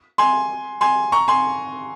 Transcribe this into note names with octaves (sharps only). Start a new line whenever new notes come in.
G#5 C6
G#5 C6
A#5 C#6
G#5 C6